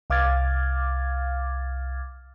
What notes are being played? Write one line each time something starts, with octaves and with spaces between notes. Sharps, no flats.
C2 F5 D6 F6 G#6 A6